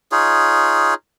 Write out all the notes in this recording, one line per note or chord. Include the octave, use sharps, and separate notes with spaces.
D#4 F4 G#4 C#5